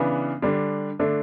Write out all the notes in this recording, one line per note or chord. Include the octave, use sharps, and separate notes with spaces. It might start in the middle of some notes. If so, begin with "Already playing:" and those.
Already playing: C#3 E3 B3 D4
D3 G3 D4
D3 A3 D4